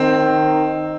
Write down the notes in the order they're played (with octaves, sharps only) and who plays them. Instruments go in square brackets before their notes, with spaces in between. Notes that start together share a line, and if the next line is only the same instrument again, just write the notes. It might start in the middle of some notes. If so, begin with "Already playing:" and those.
Already playing: [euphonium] D#3 [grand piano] C4